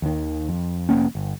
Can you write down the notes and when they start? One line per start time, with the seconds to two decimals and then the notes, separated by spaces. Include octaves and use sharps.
0.02 D#2 D#3
0.49 F2
0.89 F1 G#2 A#3 C#4
1.15 G1